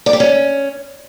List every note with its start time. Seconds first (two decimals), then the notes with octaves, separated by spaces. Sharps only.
0.06 D5
0.13 G4
0.20 C#4